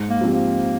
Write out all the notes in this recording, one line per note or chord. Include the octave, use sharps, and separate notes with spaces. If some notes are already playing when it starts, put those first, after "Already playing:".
Already playing: G#2
A#3
F3 C4 G4
A#3